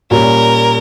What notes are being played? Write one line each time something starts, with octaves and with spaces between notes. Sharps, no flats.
A#2 G3 C#4 A#4